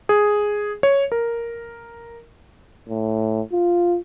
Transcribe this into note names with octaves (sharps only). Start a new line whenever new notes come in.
G#4
C#5
A#4
A2
F4